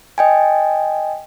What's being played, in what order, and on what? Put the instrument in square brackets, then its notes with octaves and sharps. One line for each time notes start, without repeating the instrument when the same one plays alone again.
[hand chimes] D#5 G5 G#5